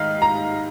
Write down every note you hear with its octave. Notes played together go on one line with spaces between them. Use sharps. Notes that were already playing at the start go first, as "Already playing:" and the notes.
Already playing: G#2 D#3 D#5 F5
A#5